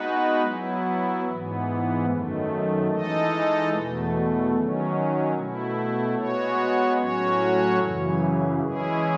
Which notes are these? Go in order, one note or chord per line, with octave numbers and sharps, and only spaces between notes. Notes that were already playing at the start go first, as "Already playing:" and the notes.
Already playing: G#3 B3 D#4 F#4 B4
F#3 B3 E4
G#2 E3 B3
F#2 D#3 A3
E3 G#3 D#4 A4 D#5
E2 B2 A3
D#3 F#3 C#4
B2 A3 E4
G#3 B3 F#4 C#5
A2 F#3 C#4 F#4 C#5
F#2 C#3 E3
E3 G#3 C#4 E4 G#4